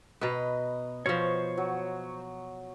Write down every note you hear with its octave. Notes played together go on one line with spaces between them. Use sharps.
B2 B4 D#5 A#5
B2 F3 C5 C#5 C#6
F#3